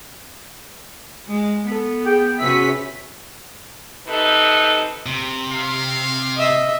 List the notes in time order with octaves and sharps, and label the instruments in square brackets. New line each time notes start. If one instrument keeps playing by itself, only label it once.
[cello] G#3
[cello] B3 [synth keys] A4 B6
[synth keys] G#4 [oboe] G5
[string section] C3 C#4 B6 [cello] F#4 B4 [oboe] E5
[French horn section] C3 D#4 A4 B4
[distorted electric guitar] C3
[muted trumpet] F5
[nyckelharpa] D#5 E5